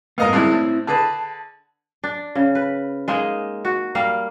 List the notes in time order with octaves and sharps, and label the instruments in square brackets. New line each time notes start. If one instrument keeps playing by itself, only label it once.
[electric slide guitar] G#2 A#3 B3 [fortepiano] A#4 D#5 F5
[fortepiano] G2 D#3 G#3 [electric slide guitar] C4 E4
[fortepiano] A2
[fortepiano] D3 G#4 B4 [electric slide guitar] A5
[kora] D4
C#3
B4
G#3 A#3 D#4
F#4
G3 A#3 F5